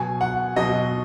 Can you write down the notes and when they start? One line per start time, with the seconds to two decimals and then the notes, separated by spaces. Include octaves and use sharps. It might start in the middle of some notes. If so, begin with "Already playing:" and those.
Already playing: B2 F#3 G#5
0.21 F#5
0.56 B2 F#3 D#5